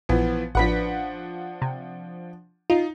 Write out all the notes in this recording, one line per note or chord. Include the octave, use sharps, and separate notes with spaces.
A#1 E3 F3 B3
A1 F3 D4 B4 F#5 B6
C3
D#4 F4